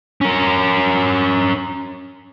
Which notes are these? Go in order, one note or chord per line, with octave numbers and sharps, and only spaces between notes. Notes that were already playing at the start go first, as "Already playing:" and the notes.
C#4 A#4